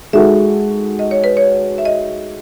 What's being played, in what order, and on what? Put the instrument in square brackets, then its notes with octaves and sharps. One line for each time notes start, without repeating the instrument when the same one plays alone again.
[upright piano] G#3 D#4 F#4 A4 [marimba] E5
[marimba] D#5
C#5
B4
C#5
E5
D#5